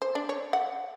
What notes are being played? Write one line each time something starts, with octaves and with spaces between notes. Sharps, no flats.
C5
D4
C#5
F#5